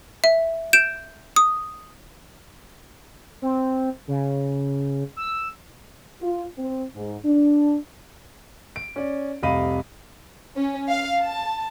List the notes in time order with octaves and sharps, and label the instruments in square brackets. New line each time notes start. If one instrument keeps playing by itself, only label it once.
[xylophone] E5
G6 D7 E7
D#6
[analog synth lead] C4
C#3
E6
[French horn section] F4
C4
G#2
D4
[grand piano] D7
C#4 D5
F1 C2 D#5 F5 B5 D#7
[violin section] C#4
F5
A5